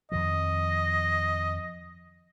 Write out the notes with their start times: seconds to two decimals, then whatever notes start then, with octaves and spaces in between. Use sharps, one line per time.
0.12 F2 D#3 F3 D#5